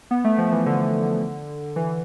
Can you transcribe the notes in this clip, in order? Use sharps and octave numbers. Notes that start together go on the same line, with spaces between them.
B3
A3
F3
E3
D3
E3